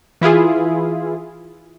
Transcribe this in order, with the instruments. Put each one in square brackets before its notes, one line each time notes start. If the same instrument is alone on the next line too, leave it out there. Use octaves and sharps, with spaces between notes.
[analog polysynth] E3 E4 F4 G#4